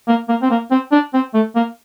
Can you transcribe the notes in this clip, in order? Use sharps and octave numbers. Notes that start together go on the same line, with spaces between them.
A#3
A#3
C4
A#3
C4
D4
C4
A3
A#3